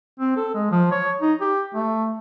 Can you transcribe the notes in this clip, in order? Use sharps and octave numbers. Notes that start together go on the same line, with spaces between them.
C4
A4
G#3
F3
C#5
D#4
G4
A3